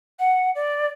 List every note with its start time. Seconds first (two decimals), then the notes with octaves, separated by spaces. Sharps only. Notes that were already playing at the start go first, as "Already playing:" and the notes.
0.19 F#5
0.55 D5